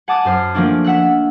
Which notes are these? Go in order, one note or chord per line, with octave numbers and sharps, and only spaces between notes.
F#5 G#5 A5 D6 D#6 F#6
F#2 C5 F6
F3 A3 A#3 C#4 D4
E5 F#5 E6 F#6